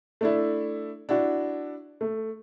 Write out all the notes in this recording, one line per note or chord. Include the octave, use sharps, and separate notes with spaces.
A3 D4 E4
D4 E4 F#4
A3